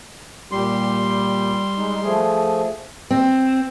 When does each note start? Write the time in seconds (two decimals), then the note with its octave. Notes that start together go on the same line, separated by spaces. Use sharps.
0.52 A#2 G3 G4 C6
1.77 G#3 D#4
2.03 F3 A3 G#4
3.11 C4